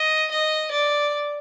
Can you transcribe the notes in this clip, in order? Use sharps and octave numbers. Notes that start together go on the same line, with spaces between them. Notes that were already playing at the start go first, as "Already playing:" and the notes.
Already playing: D#5
D#5
D5